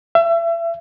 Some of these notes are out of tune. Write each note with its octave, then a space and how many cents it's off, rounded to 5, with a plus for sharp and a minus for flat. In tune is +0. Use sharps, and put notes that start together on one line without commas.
E5 +35